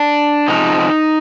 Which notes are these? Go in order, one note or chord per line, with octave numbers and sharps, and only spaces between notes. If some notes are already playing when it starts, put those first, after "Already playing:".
Already playing: D4
C3 F3 G#3 D#4